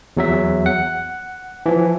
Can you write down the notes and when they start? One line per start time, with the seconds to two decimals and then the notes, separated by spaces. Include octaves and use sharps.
0.17 E2 F#3 E5
0.66 F#5
1.66 E3 F3